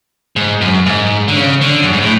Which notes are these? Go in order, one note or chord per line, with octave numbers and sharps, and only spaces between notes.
G#2
F#2
G#2
D3
C#3
D3
F#2
G#2
A2